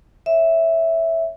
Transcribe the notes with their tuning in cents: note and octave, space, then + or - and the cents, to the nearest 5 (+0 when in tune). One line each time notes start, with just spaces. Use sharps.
C#5 +5 E5 +0